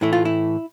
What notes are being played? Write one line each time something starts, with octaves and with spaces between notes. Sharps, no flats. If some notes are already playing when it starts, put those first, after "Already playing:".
A2 E3 A3 E4
F4
E4